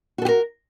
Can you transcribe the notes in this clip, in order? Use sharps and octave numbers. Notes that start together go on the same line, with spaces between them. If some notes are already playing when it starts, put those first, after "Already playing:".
F#4 G4 A4 A#4